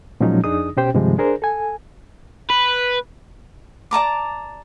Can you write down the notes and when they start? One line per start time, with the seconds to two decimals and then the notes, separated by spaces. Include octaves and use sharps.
0.20 A#2 F3 F#3 G#3 C#4 D#4
0.44 F2 D4 D#4 G#4 D#6
0.77 B2 C#4 G4 C5 G5
0.94 G2 C3 D#3 F3 G3 G#3
1.18 D4 G#4 A#4 C5
1.42 A4 G#5
2.50 B4
3.91 D5 A5 A#5 D6